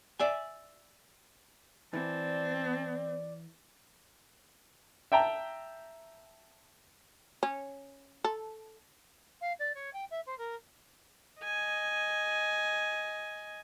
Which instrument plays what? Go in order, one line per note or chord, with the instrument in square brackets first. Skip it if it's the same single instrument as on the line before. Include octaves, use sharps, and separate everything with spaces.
[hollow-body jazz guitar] D5 E5 G#5
[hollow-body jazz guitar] E3 [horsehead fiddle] C4 [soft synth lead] D5 [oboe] A5
[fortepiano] E5 G5 A5 A#5
[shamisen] C#4
A4
[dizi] F5
D5
C#5
G5
E5
C5
A#4
[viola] D#5 G#5